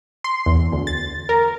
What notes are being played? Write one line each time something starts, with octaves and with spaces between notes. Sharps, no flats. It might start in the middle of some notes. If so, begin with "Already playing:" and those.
C6
E2
D2
A6
A#4